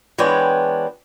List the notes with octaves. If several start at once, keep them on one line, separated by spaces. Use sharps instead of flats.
E3 G#3 B3 D4 C#5 G5